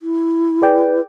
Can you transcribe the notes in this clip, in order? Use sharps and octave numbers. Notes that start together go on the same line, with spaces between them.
E4
G#4 B4 D5 G5